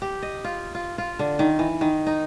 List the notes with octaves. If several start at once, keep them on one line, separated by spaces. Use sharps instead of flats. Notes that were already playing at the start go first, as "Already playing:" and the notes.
G4
D#5
F4
F4
F4
D3
D#3
E3
D#3
D#4